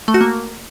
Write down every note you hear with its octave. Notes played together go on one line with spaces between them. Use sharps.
A3
F#4
A#3